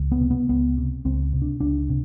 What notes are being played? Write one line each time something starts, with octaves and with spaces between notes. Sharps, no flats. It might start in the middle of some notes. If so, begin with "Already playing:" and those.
Already playing: C#2
B3
C3
B3
C#2 B3
C3
C#2 C4
C3
D4
C#2 D4
C3